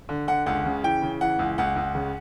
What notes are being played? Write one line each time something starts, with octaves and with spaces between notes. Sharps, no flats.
D3
D3 F#5
C#2 F#5
C#3
E3 G5
C#3
E3 F#5
C#2
C#2 F#5
C#2
C#3